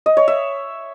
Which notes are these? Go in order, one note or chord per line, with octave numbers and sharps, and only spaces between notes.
D#5
C#5
E5